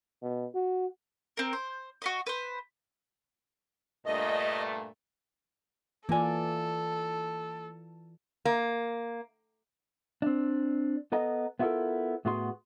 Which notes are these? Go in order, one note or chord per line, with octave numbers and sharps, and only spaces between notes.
B2
F#4
C4 A#4
C5
F#4 B4 D#5
B4 C5
G2 A#2 A3 D#5
E3 A#3 F4 A4 D5 G#5
A#3
C4 D4
B3 A4 D#5 A#5
B3 E4 F4 G4 A4 A#4
A2 B3 F#4 G#4 C6